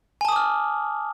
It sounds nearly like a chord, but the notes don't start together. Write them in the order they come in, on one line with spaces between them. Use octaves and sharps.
G#5 A5 D#6 D6 F6